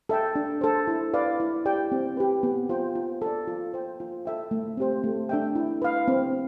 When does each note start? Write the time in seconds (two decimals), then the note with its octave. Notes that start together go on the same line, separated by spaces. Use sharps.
0.09 A4 E5 G5
0.35 D4
0.61 A4 C5
0.87 E4
1.14 B4 D5 F5
1.40 E4
1.65 G4 D5 G5
1.92 C4
2.17 G4 B4
2.43 B3
2.69 F4 C5 G5
2.95 F4
3.22 A4 D5
3.48 F4
3.74 C5 G5
4.00 F4
4.25 A4 E5 G5
4.51 A3
4.77 C4 G4 C5
5.04 A3
5.29 D4 A4 E5 G5
5.55 E4
5.82 B4 F5
6.08 C4